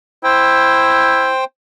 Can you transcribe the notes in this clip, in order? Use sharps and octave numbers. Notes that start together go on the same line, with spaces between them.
E4 C5 G5